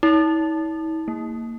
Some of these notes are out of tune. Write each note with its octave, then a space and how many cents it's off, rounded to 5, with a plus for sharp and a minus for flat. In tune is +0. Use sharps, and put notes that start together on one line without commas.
E4 -45
A#3 -25